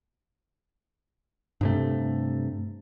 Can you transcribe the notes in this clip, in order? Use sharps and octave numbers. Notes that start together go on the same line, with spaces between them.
G2 C3 A3